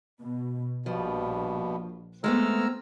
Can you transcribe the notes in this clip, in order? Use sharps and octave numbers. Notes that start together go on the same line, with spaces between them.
B2
A#1 G2 B2 F3
G#3 A3 B3 C4 A#5 E6 F6